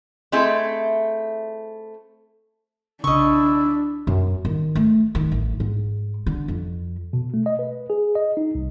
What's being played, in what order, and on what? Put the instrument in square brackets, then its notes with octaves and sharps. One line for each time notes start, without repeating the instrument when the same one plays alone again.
[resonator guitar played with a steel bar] A3 C4 E4 G#4 D#5 E5
[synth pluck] B1 C#3 [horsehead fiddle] D4 [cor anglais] E4 [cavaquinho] D#5 C#6
[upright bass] F#2
D#3
A3
D#3
A1
G#2
D3
F2
[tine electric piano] B2
A3
D#5
B4
G#4
D#5
D#4
C2